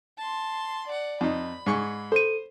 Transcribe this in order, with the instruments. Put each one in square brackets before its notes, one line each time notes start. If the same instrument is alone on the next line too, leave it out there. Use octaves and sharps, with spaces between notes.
[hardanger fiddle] A5 C6
D5 F#5
[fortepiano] F2 D#4 [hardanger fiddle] B5
[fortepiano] G#2 G#4 C#6
[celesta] A4 D#7 [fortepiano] C5